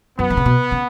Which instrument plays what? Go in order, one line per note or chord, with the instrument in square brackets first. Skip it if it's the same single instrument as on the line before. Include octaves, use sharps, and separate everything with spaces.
[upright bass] F#2 [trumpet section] B3
[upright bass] D#3
C#3
B2
C#3